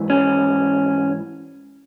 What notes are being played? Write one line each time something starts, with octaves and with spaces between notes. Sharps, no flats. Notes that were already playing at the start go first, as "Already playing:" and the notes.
Already playing: G#2 E3
C#4